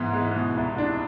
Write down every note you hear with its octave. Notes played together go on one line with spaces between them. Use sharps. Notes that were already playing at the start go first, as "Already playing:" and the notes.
Already playing: G#2 E3 B3
G#3
B2
C2
D4